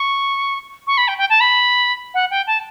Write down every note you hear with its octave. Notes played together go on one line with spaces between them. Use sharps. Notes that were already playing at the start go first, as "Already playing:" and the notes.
Already playing: C#6
C#6
B5
G5
G5
A5
B5
F#5
G5
A5